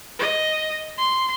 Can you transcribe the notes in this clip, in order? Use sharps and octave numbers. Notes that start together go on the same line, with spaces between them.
D#5
C6